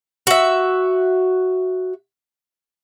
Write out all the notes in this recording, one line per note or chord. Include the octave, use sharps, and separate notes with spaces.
F#4 E5